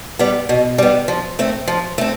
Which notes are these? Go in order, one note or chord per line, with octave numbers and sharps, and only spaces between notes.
G3 B3
B2
G3 B3
F3
A3 C4
F3
A3 C4